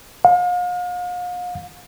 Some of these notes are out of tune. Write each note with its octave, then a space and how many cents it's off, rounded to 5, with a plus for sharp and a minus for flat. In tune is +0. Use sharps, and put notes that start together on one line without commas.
F5 +40